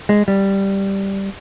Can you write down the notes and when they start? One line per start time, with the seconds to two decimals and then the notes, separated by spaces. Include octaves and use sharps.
0.09 G#3
0.28 G3